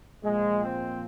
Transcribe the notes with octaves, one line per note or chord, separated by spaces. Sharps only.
A#2 F3 G#3
C4